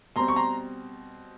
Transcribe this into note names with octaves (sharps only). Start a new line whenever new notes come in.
B2 G3 C4 A#5 C6
C#6
A#5 C6